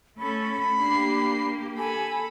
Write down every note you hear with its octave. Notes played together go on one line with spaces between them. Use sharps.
A3 C#4 A4 B5
A#3 D4 G4 C7
A4 G#5 B5